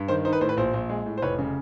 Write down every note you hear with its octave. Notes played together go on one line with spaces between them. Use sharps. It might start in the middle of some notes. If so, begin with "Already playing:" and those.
Already playing: G2
D#3 C5
D#4 C5
B4
A2 C5
B4
A#1 C5
A#1
G#3
A2
C5
F1 B4 C#5
C#3